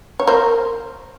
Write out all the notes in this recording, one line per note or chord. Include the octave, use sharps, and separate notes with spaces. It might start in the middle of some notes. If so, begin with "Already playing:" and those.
C#5
A#4 C5